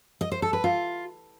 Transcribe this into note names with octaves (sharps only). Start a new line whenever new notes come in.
D#5
C5
A4
B4
F4